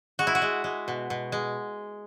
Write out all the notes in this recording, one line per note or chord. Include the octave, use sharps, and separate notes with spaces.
G#3 F#4
E4
F#4
G#3
G#3
B2
B2
G#3